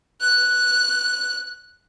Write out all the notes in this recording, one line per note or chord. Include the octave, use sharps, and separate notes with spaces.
F#6